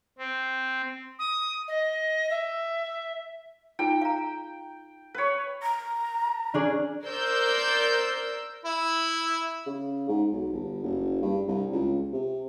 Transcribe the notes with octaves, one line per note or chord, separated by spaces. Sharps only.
C4
D#6
D#5
E5
D#4 F4 G#4 G5
F5 A#5
B4 C#5
A#5
C#4 D4 G#4
A#4 C5 D5 E6 G6
E4
C#3
G#2
B1
G1
F#1
G2
C2
C#2
C3